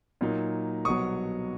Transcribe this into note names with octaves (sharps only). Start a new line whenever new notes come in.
A#2 F#3 A#3 D#4
C2 B2 F#3 C#6 D#6